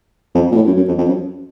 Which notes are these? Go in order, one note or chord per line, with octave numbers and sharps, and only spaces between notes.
F2
A#2
A2
F#2
F#2
F2
F2
F#2